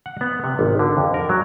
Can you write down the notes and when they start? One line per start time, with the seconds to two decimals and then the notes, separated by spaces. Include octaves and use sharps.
0.06 F#5
0.21 B3
0.44 C3
0.59 G#1
0.79 D3
0.97 F2
1.14 A#4
1.29 F#3